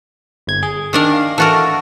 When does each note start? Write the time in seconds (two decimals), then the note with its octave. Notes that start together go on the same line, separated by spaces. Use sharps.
0.47 G1 G#6
0.63 G#4
0.93 D#3 D4 A#4
1.13 F5
1.38 E3 F#4 A4 A#4 F#5 A5